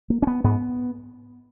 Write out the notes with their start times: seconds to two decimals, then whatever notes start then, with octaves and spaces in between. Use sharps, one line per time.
0.10 A#3
0.22 C#4
0.27 B3
0.44 G#2 B3